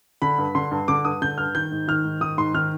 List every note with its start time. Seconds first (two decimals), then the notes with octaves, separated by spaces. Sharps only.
0.22 D3 B5
0.38 G2
0.55 D3 C6
0.71 G2
0.88 D3 D6
1.05 G2 D#6
1.22 D3 G6
1.38 G2 F6
1.55 D#3 G6
1.71 G#2
1.88 D#3 F6
2.05 G#2
2.21 D#3 D#6
2.38 G#2 C6
2.54 D#3 F6